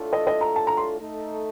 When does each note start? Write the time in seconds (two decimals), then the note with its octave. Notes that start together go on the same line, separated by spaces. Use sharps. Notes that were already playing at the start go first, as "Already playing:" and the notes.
Already playing: A2 A3 D4 F4 A4
0.13 D#5
0.27 D#5
0.41 A#5
0.56 A5
0.67 A#5
0.77 C6
0.99 A3 D#4 A4